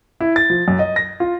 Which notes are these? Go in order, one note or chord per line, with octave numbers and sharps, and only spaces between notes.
E4
A6
F3
F#2
D#5
A#6
F4